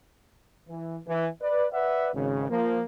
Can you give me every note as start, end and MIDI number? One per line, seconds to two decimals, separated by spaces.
0.69 0.97 52
1.07 1.29 52
1.41 1.67 71
1.41 1.67 74
1.73 2.10 71
1.73 2.10 74
1.73 2.10 76
1.73 2.10 78
2.14 2.50 32
2.14 2.50 49
2.50 2.83 53
2.50 2.83 58